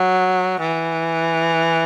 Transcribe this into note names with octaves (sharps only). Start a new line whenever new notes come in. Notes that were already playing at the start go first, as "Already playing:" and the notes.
Already playing: F#3
E3